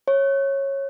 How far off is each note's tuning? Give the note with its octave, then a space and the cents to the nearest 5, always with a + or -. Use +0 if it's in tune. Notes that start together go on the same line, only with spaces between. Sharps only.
C#5 -15